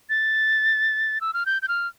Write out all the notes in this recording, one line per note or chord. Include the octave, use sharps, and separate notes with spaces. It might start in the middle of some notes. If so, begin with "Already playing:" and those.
A6
E6
F6
G6
G6
F6